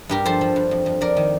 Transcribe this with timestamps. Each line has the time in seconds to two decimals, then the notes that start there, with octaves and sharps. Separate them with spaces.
0.09 G2 G4 A#4
0.26 F3 A4 C5
0.41 F3
0.56 G2
0.71 F2
0.86 F2
1.01 F2 A#4 D5
1.17 D#3